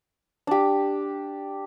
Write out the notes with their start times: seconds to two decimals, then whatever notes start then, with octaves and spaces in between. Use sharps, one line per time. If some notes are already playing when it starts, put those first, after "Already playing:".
0.47 D4 G4